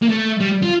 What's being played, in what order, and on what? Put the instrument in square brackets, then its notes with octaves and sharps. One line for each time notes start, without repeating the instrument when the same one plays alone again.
[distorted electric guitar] A#3
A3
G3
F4